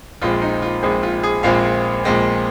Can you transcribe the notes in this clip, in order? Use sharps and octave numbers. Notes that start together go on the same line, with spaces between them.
A#1 A#2 G#3 C4 F4
D#4
F4
A#1 A#2 G#3 C4 G#4
F4
G#4
A#1 A#2 G#3 C4 F5
A#1 A#2 G#3 C4